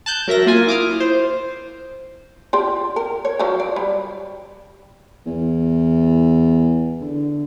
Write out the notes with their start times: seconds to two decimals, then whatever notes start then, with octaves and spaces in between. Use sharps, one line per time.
0.06 A5 F#6 G6
0.28 F#3 A#4 E5 A#6
0.46 A#3 F4 G#5
0.67 E4 D6 D#6 F6
1.00 C5
2.53 F4 G4 D5
2.96 A#4
3.25 C#5
3.39 F3 F#3
3.60 D5
3.76 G3
5.26 E2
7.01 D3